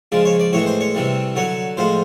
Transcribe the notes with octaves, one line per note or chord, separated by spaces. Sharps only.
C#3 F3 G#3 D5
C#5
D5
A2 E3 G#3 C#5
C5
C#5
C3 E3 G3
D3 F#3 C#5
A2 F3 G#3 C5